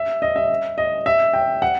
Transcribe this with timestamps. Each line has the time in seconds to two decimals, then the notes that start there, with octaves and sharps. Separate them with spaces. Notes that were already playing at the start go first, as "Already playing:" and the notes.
Already playing: E5
0.22 D#5
0.36 E5
0.78 D#5
1.06 E5
1.33 G5
1.62 F#5